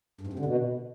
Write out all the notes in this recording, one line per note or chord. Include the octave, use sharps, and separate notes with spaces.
G2
G#2
C3
D3
B2